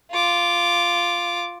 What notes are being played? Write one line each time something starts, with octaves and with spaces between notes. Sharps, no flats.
F4 D6